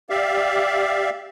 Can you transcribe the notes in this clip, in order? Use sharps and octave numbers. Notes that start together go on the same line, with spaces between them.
G4 D5 E5 F5